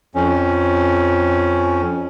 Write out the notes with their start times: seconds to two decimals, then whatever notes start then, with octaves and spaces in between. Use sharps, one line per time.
0.15 F2 C#4